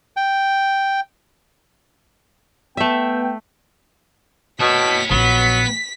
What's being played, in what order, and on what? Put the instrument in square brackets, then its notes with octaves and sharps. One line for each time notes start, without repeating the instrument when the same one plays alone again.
[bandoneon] G5
[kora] A3 E5 [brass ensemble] B3 G5
[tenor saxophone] B2 [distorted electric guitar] C#5 A5 [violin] B6
[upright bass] A#1 [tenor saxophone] F#3 [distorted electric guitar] B3 [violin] B6